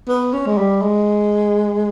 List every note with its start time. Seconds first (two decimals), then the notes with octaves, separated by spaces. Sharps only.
0.08 B3
0.33 C#4
0.46 G#3
0.58 G3
0.82 G#3